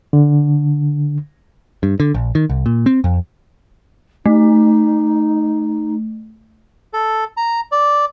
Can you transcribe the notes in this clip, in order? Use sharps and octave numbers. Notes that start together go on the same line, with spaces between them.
D3
G2
D3
A#1
D#3
C2
A#2
C4
F2
A3 D#4
A4
A#5
D5